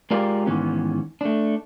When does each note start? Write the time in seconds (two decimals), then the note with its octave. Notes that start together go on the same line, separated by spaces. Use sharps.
0.10 G#3 F4 G4 A#4 D5 F5
0.47 G#2 D#3 E3 B3 C#4
1.21 A3 D4